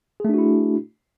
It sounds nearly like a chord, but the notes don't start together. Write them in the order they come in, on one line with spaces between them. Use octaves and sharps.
G#4 A3 D4 F#4 E4